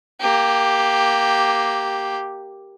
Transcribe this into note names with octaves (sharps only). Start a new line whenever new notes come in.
A#3 G4